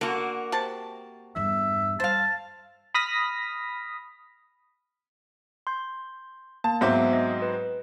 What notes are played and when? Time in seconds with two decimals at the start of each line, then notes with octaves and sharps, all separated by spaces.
0.01 D3 A#3 F#4
0.52 C3 A5
1.36 E2 G2 E5
2.00 G3 C5 F5 A5
2.94 B5 D#6 F6 A#6 B6
5.67 C6 G6
6.64 A#3 A5
6.81 G#2 F#3 B3 C4 E5 D6
7.13 D#5
7.42 B4